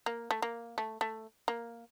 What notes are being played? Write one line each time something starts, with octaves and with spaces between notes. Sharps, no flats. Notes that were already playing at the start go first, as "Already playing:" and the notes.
A#3
A3
A#3
A3
A3
A#3